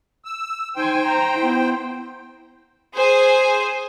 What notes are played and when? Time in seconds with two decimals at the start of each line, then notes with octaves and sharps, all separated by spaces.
0.25 E6
0.76 D#4 C5 G5 G#5
1.05 A#5
1.39 B3 E4
2.95 G#4 C5 G#5